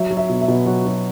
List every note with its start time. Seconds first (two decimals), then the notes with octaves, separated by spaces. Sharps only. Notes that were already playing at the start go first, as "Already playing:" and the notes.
Already playing: F#3 E5
0.11 F#3
0.17 E5
0.29 B2
0.41 E5
0.48 B2
0.66 F#3 F#4
0.85 F#3